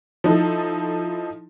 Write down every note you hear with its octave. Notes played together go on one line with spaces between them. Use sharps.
F3 D#4 E4 A4